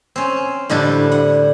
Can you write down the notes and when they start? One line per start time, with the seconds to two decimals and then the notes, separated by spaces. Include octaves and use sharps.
0.16 C4 C#4
0.70 A2 D3 G3 D4
1.12 F#5